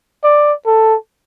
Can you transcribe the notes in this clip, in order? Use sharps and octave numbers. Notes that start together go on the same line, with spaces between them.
D5
A4